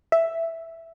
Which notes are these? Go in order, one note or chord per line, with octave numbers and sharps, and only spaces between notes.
E5